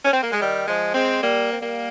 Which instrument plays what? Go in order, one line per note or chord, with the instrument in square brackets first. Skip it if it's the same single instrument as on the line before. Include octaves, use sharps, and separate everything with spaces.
[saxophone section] C#4
C4
A#3
G#3
D#3 G3
F3 G#3
G#3 C4
G3 A#3
C4
G3 A#3